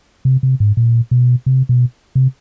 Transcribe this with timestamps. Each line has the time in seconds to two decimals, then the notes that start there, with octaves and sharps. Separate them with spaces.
0.25 C3
0.43 C3
0.60 G#2
0.77 A#2
1.11 B2
1.46 C3
1.69 B2
2.15 C3